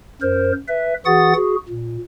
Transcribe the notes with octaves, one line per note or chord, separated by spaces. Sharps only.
F#2 A#4 C5
B4 E5
E3 F#4 G#4 F#5 D#6 A6
F#4 G#4
A#2